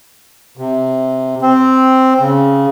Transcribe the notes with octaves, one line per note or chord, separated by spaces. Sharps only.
C3
C4
C#3